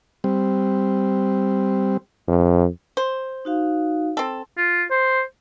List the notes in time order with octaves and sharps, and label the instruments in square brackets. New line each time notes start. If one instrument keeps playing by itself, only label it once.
[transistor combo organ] G3 C4
[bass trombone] F2
[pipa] C5
[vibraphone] D#4 F#4 F5
[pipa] C4 A4
[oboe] F4
C5